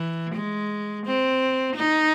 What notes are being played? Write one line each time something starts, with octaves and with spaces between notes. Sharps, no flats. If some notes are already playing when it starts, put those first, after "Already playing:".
Already playing: E3
G#3
C4
D#4